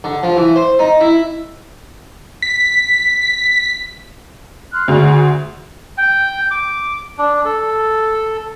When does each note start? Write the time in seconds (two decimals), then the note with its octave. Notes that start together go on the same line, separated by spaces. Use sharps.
0.04 D3
0.23 F3
0.37 E3
0.56 C5
0.79 D#4
1.01 E4
2.42 B6
4.72 C6 F6 F#6
4.88 D2 F#4 G#4 D5
5.98 G5
6.51 D6
7.18 D4
7.45 A4